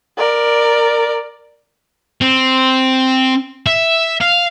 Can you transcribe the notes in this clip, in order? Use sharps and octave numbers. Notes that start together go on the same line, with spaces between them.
A#4 D5
C4
E5
F5